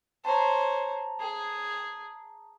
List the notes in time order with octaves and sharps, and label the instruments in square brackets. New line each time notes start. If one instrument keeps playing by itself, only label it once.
[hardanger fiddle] C5 C#5 [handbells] A5 A#5
[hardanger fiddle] G#4